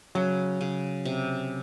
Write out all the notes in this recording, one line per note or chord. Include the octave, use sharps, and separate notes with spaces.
C#3 F#3
C#3
C3